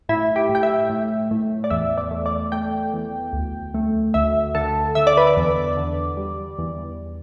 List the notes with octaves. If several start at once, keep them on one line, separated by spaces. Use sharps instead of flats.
A2 E4
G4
A2
G5
E5
A2
A2
D5
E2 E5
D5
A3
D5
A3 G5
E2
D2
A3
D2 E5
D3 A4
D3 E5
D5
B4
D5
E2
D3
G3
E2